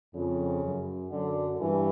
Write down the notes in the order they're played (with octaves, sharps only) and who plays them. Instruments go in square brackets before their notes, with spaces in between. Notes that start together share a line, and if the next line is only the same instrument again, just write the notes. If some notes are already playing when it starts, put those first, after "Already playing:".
[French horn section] F2 [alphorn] C#3
[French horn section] F#2
[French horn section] F#2 [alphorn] D3
[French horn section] G2 [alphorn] E3